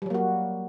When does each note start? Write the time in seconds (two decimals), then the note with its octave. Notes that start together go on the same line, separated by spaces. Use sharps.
0.02 G3
0.06 F#3
0.10 A#3
0.14 F#4